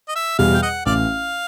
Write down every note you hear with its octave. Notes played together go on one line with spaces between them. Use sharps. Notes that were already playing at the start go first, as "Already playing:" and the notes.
D#5
E5
E2 B2 G3 F5
G5
D#5 F#5
A1 D5 F5